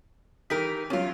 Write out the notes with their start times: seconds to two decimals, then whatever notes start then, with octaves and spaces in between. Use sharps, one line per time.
0.50 E3 D#4 G4 A#4 B6
0.90 E2 F#3 C#4 F4